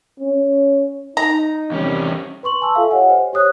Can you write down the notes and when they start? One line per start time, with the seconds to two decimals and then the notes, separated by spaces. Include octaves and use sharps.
0.20 C#4
1.17 D#4 A#5
1.72 E2 C3 D#3 G3 C#4
2.43 B4 C6 C#6 F#7
2.61 G#5 A5 C6 E6
2.75 F4 A4 E5 F5
2.90 G4 C#5 D#5 F#5 G#5
3.10 C5
3.33 G4 C#5 D#6 F#6